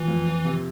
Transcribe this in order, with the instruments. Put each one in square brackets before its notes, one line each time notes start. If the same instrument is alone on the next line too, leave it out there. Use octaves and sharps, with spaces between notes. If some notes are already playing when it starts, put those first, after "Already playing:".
Already playing: [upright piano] A#2 [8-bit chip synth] E3
[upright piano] F2
F3
C3